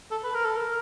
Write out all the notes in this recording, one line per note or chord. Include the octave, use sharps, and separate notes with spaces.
A4
B4
A#4
A4
A#4